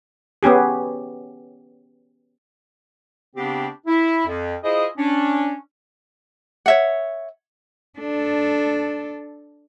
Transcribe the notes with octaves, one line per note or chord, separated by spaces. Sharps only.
B3 C#4 G4 G#4
C#3 B3 C4 D4 G4
E4
F2
E4 F4 G#4 C5 D#5
C#4 D4
C#5 E5 F#5
D4 A4